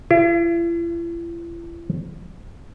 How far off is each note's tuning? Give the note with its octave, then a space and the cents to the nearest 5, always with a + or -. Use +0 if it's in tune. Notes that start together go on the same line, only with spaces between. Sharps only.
E4 +45